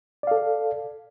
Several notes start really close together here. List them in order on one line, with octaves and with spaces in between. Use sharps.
D5 F5 A4